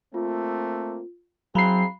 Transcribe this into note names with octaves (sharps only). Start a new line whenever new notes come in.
A3 A#3 C4 F4
F#3 C4 E4 G#4 F5 A#5 B5 C7